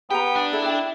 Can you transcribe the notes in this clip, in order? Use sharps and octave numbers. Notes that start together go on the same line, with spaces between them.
B3 G4 G5 A#5
D4
E4 A4
G5